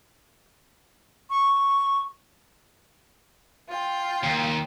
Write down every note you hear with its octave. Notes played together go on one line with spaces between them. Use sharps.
C#6
F4 G5
D#2